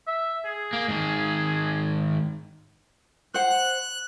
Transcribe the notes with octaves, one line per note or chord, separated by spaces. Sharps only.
E5
G#4
A#3
G#2 D#3
C5 F#5 F#6